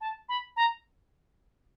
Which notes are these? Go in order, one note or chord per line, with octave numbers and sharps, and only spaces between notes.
A5
B5
A#5